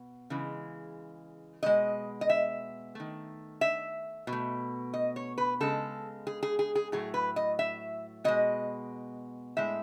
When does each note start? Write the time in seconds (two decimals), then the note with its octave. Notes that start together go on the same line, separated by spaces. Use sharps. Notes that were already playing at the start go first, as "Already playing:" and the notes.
Already playing: B2
0.30 C#3 E3 G#3
1.63 B2 G#3 D#5
2.21 D#5
2.29 E5
2.95 D#3 A3
3.61 E5
4.27 B2
4.32 A3
4.94 D#5
5.16 C#5
5.38 B4
5.60 C#3 G#3 A4
6.27 G#4
6.43 G#4
6.59 G#4
6.75 G#4
6.92 A2 F#3 A3 G#4
7.14 B4
7.36 D#5
7.59 E5
8.24 B2 G#3 D#5
9.57 A2 G#3 E5